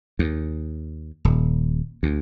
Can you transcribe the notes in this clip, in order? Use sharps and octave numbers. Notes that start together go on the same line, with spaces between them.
D#2
D#1
D2